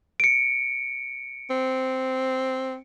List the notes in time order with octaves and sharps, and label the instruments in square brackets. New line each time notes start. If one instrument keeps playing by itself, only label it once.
[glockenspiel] C#7 D7
[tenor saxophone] C4